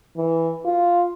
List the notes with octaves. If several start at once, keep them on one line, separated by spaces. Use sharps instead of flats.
E3
F4